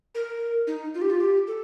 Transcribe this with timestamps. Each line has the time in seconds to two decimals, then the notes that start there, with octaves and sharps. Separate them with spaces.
0.15 A#4
0.67 D#4
0.94 F4
1.02 G4
1.10 F4
1.20 G4
1.47 A4